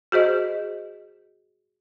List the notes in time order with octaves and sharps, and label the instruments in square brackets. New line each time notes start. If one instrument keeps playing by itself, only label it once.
[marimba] F#4 G#4 C5 D#5